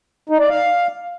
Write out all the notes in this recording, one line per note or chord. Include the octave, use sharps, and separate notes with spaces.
D#4
D5
F5